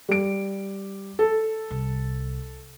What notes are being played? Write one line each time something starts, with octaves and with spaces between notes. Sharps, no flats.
G3 D7
A4
C2